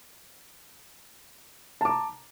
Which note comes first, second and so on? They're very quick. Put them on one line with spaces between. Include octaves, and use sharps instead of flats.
A5 D6 A#5